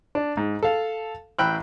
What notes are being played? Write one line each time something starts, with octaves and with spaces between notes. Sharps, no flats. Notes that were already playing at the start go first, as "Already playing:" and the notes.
D4
G#2
A4 F5
A1 G5 B5 E6 F#6